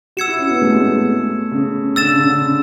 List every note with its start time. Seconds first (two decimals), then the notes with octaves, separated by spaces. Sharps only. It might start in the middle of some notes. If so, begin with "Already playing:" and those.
0.17 F#4 E6 G#6 C#7 E7
0.28 E4
0.39 C#4
0.51 B3
0.62 A3
0.71 G#3
0.80 A3
1.52 C#3
1.96 D3 E6 A6 E7
2.08 C#3
2.19 C#3
2.29 D3
2.41 C#3